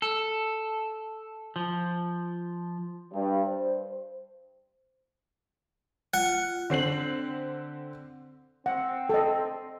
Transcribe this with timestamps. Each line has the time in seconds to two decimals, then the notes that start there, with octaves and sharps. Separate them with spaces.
0.02 A4
1.56 F3
3.13 G2
3.46 C5
6.14 F4 F#5
6.70 D3 C4 C7 F#7
8.66 C4 F#5
9.09 A4 D#5